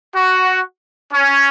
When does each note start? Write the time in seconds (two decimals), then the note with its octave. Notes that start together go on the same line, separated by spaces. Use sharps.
0.14 F#4
1.14 C#4